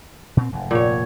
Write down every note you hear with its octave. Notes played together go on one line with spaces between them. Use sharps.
A#2 C4
F1 G#2
A#2 C#5